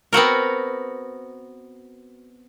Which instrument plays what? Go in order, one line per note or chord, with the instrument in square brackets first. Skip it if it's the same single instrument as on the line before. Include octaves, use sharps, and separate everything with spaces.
[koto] B3 C4 F#4 A#4